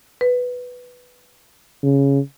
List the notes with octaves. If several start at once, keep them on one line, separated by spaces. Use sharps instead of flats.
B4
C#3